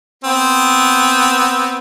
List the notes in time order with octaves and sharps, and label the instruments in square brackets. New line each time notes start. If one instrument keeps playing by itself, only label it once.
[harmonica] B3 C4